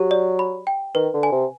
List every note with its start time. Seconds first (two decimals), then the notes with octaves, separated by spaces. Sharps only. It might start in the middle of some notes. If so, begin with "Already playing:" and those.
Already playing: F#3 G4
0.11 D5
0.39 B5
0.67 G5
0.95 D#3 B4
1.14 D3
1.23 G#5
1.32 C3